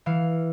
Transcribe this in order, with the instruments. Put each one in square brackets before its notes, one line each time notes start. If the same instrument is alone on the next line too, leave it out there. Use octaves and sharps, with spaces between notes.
[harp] E3 F5